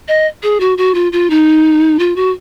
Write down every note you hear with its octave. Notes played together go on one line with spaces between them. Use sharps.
D#5
G#4
F#4
F#4
F4
F4
D#4
F4
F#4